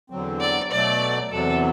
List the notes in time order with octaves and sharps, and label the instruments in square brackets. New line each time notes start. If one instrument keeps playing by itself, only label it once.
[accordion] E2 D3 F#3 C4
[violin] D5
[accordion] B2 F#3 A3 [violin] D5
[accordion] E2 C3 F#3 [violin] A4